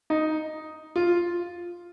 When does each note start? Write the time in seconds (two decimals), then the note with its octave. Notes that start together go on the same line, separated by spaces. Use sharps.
0.10 D#4
0.96 F4